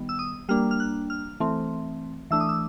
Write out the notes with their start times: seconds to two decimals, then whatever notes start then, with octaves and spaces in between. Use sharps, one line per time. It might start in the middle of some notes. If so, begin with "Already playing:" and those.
Already playing: D#3 G3 B3
0.09 E6
0.19 D#6
0.49 G3 A#3 D4 F6
0.71 F6
0.80 F#6
1.10 F6
1.40 E3 A3 C4
2.31 E3 A3 D4 E6
2.40 D#6
2.49 E6